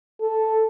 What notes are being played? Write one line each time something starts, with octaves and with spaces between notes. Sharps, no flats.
A4